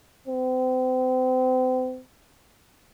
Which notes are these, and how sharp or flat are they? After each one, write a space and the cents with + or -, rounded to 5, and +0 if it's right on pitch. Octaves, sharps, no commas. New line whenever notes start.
C4 -35